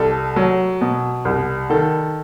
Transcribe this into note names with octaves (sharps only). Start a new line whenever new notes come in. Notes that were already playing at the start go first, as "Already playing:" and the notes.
Already playing: C2 A4
F#3
B2
C2
D#3 A4